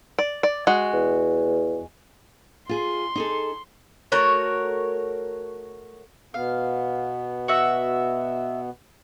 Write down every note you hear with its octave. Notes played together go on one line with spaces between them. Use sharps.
D5
D5
G#3 F#4
E2
F4 G#4 C6
D#4 G#4 A4
A3 F#4 A#4 C#5
B2 B3 F5
F#4 E5